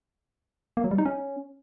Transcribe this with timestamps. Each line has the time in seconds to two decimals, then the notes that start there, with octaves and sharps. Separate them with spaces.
0.77 A#3
0.84 F#3
0.91 G3
0.98 D#4
1.05 C#4